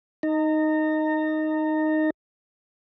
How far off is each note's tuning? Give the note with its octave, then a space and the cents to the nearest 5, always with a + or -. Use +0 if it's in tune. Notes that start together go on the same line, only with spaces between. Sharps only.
D#4 +0 A#5 -30